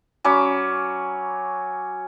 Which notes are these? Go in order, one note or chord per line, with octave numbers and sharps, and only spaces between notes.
F#3 C#4 B5 D6